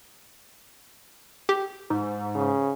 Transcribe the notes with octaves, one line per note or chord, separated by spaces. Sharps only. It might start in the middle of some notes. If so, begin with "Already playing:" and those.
G4
G#2
C#3